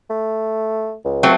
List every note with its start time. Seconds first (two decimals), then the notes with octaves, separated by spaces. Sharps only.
0.10 A3
1.05 C#2
1.23 F#3 A3 C4